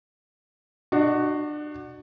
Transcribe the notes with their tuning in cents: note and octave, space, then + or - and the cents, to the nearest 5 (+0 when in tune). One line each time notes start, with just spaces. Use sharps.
D4 +30 F#4 +0 D#5 +0